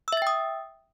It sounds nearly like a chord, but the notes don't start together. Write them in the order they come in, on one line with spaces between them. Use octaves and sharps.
E6 E5 A6 G5 D#6